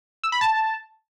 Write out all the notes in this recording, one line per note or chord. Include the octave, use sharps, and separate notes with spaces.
E6
B5
A5